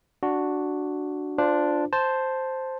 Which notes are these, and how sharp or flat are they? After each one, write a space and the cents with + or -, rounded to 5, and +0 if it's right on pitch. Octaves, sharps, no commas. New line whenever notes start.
D4 +0 F#4 +0
D4 +0 F4 +0 C5 -25
C5 +0 A5 +0